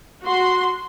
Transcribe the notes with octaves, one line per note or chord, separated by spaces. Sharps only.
F#4 C6